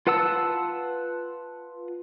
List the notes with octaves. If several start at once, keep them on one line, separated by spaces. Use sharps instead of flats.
F4 B4 F#5 A5 E6